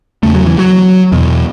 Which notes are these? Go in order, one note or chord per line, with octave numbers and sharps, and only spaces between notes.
E2 C#3 A3
F#3
E3
F#3
E2 B2